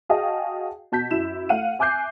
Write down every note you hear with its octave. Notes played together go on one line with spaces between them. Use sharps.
F#4 G#4 D#5 F5 G5 A5
B2 A5 G6 B6
F#2 E4 E7
A3 F5 F#5 D#7
E5 G#5 D6 F#6 G6 C7